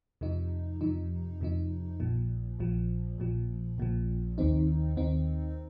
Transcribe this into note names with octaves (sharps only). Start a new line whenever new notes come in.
F2 C3 F3 D#4
F2 C3 F3 D#4
F2 C3 F3 D#4
A#1 A#2 F3
A#1 A#2 F3
A#1 A#2 F3
A#1 A#2 F3
D#2 D#3 C4 D#4
D#2 D#3 C4 D#4